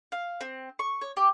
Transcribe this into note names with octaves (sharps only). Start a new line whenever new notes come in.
F5
C4
C#6
C#5
G4